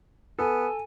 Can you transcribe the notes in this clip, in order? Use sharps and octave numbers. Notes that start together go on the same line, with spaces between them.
B3 A4 G#5